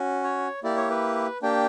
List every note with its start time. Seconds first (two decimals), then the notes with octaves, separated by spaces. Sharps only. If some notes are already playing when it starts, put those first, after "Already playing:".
Already playing: C#4 F#4
0.24 C#5
0.64 A#3 E4 G4 D5
0.77 C#5
0.90 B4
1.43 A#3 D4 G4 G5